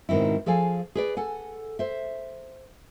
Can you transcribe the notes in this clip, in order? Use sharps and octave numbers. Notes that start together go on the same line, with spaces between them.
G#2 B2 D#3 C4 E4
F3 G#4 A4 F5 G#5
G#4 B4 D5
A4 F#5 G#5
C5 E5